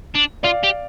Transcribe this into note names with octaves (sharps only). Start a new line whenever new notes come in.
D4
F4 D5 F5
G4